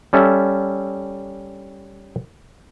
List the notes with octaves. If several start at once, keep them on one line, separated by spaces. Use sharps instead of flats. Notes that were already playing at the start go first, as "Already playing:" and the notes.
G3 C#4 A4 E5